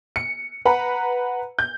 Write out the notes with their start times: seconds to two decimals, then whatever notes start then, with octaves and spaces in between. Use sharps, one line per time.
0.16 C#7
0.65 B4 F#5 A#5 B5
1.59 G6